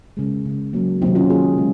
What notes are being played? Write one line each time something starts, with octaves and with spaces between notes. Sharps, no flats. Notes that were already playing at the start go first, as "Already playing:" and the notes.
C#3 G#3
C#3 G#3
C#3 F#3 A#3
C3 D#3 F#3 A#3 C4 D#4
C#4 F4
D#3 A#3 F4 G#4
C#3 G#3